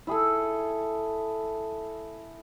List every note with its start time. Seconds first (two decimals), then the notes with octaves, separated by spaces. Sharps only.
0.07 E4 G#4 A4